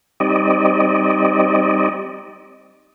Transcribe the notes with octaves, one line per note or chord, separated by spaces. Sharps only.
G3 C4 D#4 D5 D#5